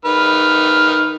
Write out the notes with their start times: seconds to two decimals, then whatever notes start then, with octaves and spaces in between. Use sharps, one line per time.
0.05 D#3 B4 F6